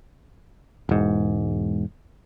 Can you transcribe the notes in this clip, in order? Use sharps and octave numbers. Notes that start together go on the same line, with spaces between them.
E1 G#2